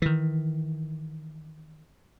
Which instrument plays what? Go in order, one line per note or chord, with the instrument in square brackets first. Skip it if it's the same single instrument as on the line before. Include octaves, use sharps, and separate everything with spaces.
[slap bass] D#3 E3